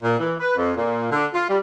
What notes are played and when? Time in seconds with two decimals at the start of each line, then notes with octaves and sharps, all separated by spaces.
0.03 A#2
0.19 E3
0.39 B4
0.57 F2
0.76 A#2
1.12 D3
1.33 F4
1.48 G3